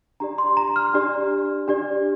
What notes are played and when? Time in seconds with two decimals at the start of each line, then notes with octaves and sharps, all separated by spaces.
0.20 D4 G4 D5 A#5
0.38 C6
0.57 A#5
0.76 F6
0.94 D4 G4 D5
1.68 D4 G4 D5